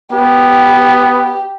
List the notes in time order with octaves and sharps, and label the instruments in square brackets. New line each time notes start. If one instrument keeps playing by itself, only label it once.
[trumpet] B3 [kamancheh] G4